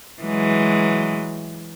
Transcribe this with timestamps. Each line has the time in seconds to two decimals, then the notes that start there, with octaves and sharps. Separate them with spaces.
0.23 E3 F#3 G#3